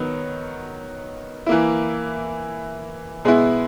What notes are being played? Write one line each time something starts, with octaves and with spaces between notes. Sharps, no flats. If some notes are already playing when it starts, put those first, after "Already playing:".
Already playing: D#3 F#3 B3
E3 A#3 E4
B2 G#3 B3 E4